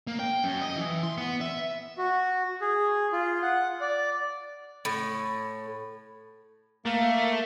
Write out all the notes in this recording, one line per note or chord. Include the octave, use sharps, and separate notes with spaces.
A#3
G5
F#2
D#5
E3
C6
B3
E5
F#4
G#4
F4
F#5
D5
A2
A3 A#3